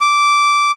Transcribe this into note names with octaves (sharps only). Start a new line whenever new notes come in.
D6